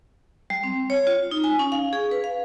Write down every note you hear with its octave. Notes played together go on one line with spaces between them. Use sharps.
G3
C4
C#5
F4
D#4
G#5
C#4
F5
G#4
B4
F5